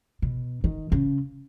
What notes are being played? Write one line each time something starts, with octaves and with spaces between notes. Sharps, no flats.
B2
D#3
C#3